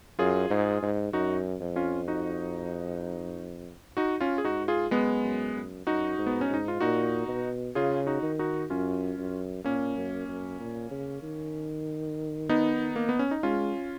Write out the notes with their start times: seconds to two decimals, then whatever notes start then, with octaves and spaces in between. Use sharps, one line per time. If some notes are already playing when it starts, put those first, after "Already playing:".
0.19 F#2 F4 G#4
0.50 G#2
0.82 G#2
1.13 F#2 D#4 F#4
1.61 F2
1.76 C#4 F4
2.08 D#4 F#4
3.97 D#4 F#4
4.21 C#4 F4
4.38 G#4
4.44 G#2 D#4 F#4
4.68 F4 G#4
4.91 F#2 G#3 B3
5.23 F#2
5.55 F#2
5.87 F#2 D#4 F#4
6.18 G#2
6.27 B3
6.41 C#4
6.50 G#2 D#4
6.68 F4
6.81 A#2 D#4 F#4
7.28 B2
7.75 C#3 F4 G#4
8.07 D#4 F#4
8.23 D#3
8.39 D#4 F#4
8.70 F#2 C#4 F4
9.18 F#2
9.64 A#2 A#3 C#4
9.97 F#2
10.28 F#2
10.60 A#2
10.91 C#3
11.23 D#3
12.49 B3 D#4
12.96 A#3
13.09 B3
13.19 C#4
13.31 D#4
13.43 G#3 C#4 F4